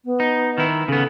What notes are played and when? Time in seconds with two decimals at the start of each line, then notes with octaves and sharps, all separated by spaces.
0.05 B3
0.20 D#4
0.58 D#3 E4
0.88 C#3 B3 A4